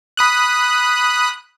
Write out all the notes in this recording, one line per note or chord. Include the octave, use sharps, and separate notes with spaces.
B5 D#6 F#6